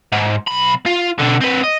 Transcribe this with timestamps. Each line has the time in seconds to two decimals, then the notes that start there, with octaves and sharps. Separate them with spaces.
0.12 G#2
0.48 B1 B5
0.86 F4
1.19 B2 D3
1.41 C4 B4
1.63 D#5